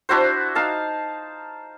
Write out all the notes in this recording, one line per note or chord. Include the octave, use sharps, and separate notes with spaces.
D4 E4 F#4 C5
D#4 F5 A5